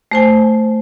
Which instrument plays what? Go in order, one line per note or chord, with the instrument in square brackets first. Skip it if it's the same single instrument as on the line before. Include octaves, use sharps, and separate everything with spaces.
[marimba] A3 C5 G#5